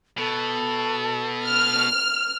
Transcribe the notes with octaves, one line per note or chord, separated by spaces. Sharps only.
B2 A4
F6